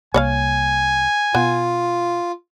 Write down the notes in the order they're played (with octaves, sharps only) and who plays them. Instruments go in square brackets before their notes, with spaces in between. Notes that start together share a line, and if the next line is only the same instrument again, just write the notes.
[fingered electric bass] C2 A#3 [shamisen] C#5 D5 F5 [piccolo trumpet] G#5
[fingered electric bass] B2 [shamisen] B3 [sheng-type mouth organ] F4